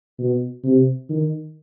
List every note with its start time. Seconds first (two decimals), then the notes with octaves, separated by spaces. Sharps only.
0.18 B2
0.64 C3
1.09 D#3